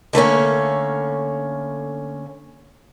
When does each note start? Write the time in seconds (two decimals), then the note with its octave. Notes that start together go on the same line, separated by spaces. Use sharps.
0.13 D3 A3 A#3 C#4